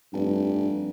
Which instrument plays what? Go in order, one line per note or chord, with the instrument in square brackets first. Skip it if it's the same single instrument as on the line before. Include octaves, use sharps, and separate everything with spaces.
[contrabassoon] F1 [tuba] G2